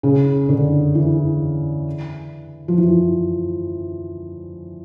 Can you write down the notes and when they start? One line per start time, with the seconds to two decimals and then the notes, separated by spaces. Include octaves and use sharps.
0.03 C#3
0.49 D3
0.95 E3
2.68 F3
2.78 E3